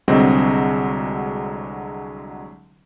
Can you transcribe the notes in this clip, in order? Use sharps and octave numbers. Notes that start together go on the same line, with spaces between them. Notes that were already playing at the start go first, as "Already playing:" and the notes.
C2 D3 F#3 G#3 C4 D#5